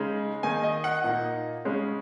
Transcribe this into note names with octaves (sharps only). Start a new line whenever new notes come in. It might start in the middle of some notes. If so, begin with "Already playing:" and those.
Already playing: C#3 G#3 D#4
D#3 A#3 D#4 G#5
D#5
F#5
A#2 A#3 D#4
C#3 G#3 C#4